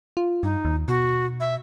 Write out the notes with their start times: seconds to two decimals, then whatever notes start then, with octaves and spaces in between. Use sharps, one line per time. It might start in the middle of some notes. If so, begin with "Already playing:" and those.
0.17 F4
0.43 G2 D#4
0.65 D#2
0.88 B2 F#4
1.40 E5